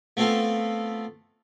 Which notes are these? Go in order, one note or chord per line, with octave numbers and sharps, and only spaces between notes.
A3 B3 C4 F4 A4